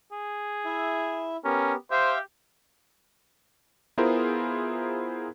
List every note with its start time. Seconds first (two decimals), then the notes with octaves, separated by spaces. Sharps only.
0.12 G#4
0.65 E4 E5
1.45 B3 C#4 G4 A#4
1.91 G4 C5 E5 F5 G5
3.98 B3 E4 F4 G#4 A#4 C5